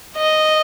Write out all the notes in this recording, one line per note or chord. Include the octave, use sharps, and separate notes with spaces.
D#5